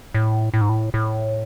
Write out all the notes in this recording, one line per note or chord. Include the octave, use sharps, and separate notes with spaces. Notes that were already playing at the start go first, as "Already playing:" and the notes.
A2
A2
G#2
A2
A2